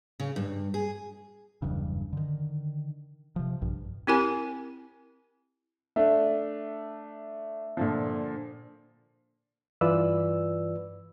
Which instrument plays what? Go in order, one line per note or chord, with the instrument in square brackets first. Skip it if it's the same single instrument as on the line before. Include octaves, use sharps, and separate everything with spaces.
[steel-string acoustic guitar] C#3
G2
G#4
[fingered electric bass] F#1 E2 G2 C#3
D3 D#3
C3 F3
A#1 G2
[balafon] C4 E4 G4 A#4 G#5
[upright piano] A3 D4 [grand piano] E5
[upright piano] A#2 D3 F3
[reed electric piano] G2 E3 F4 B4 D5 E6